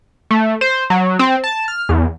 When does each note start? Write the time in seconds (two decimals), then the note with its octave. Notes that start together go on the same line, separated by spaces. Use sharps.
0.31 A3
0.61 C5
0.90 F#3
1.19 C4
1.44 A5
1.68 F6
1.89 E2